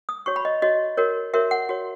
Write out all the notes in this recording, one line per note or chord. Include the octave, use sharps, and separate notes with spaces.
D#6
F#4 C#5 C#6
B5
D#5
F#4 C#5 D#5
F#4 A#4 C#5
F#4 A#4 C#5 E5
F#5
F#4 C#5